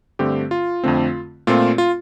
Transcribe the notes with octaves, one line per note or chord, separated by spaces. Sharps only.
G2 D3 A3 C4 G4
F4
F2 D3 A3 C4
A#2 A3 C4 F4
F4